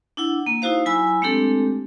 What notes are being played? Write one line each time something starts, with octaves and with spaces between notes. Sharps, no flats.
D4 E4 F#5
A#3
D#4 E4 F#4 C5 F5
F#3 E4 G#5 B5 E6
G#3 A3 C4 D4 G4 A4